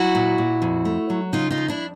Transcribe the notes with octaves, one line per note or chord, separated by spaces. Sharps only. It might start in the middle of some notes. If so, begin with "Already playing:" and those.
Already playing: F#3 E4 F#4
A#2
A#2
F2
A3
F#3
C#3 D#4 F4
D#4 F4
F2
D4 E4